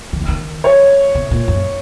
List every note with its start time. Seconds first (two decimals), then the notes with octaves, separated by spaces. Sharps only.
0.13 D#3
0.21 E3
0.28 D#3
0.64 C#5
1.15 B2
1.31 A#2
1.48 F#2